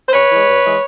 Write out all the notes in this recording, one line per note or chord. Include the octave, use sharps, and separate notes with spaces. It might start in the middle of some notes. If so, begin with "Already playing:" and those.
C5
G2 B4 C#5
E3 G#3
G2
E3 G#3